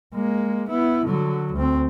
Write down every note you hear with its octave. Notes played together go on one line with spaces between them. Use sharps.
G#3 A#3
B3 E4
D3 F#3
D2 C4